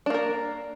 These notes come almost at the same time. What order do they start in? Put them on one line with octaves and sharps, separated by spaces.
D4 A#3 A#4